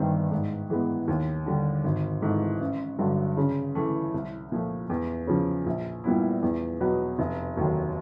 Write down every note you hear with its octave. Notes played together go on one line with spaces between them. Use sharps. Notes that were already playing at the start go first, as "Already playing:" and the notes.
Already playing: G1 G2 D#3 G3 C4
G#2
E3 G#3 B3
D#2
D3 G3
G#1
G#2 E3 A3
A1
G2 D3 F#3
C#3
E3 A3
C2
A#2 F3 A3
E2
C#3 F3
A#1
A#2 G3 B3 E4
E2
B2 F#3 B3
F1
D#2 D#3 F#3 A3